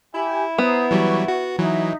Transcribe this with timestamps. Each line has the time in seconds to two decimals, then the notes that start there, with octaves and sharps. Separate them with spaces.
0.14 E4 G4 G#5
0.58 B3 C5 A#5 D#6
0.91 E3 F#3 G3 B4 C#6
1.28 F#4
1.59 E3 F#3 D#4 E5